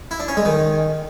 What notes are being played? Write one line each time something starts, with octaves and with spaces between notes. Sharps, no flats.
E4
D4
C#4
G#3
D#3